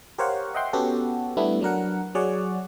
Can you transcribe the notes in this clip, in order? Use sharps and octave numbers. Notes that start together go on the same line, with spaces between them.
G4 A#4 C5 C#5 F5 F#5
D#5 E5 F#5 G5 C6
B3 C#4 F#4 G4 A4
G3 A3 B3 D4 E4
F#3 D4 A#4 F#5
F#3 G#4 C#5 D5 F#5